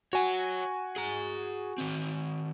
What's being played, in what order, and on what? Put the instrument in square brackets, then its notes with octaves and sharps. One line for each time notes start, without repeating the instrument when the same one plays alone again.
[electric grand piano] F#4 G#5 [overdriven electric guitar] C#5 F#5
[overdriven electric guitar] G#4 A#5
D#3 C4